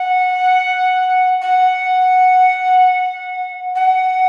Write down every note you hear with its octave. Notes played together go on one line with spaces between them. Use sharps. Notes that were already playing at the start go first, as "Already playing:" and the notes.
Already playing: F#5
F#5
F#5